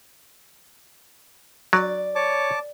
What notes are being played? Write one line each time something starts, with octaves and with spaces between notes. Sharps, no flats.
F#3 D5
C#5 A5 D6